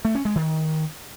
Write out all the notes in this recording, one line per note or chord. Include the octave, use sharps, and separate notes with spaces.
A3
C#4
G#3
D#3